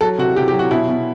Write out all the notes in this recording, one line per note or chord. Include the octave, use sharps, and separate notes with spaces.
F#3 A4
C3 F#4
C3 G4
G4
F#3
F#4
B2 E4
B2